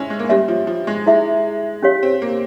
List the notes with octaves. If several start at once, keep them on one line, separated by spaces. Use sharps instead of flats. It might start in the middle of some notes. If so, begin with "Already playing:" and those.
Already playing: G#3 C#4 E4
G#3
A#3
G3 C#4 G4 C#5 E5
F3
F3
G#3
E4 G#4 E5
C#4 G4 C#5 F5
C4
A#3